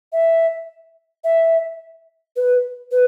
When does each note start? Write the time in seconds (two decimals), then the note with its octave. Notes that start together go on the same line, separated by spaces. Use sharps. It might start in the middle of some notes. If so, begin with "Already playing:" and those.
0.13 E5
1.24 E5
2.36 B4
2.91 B4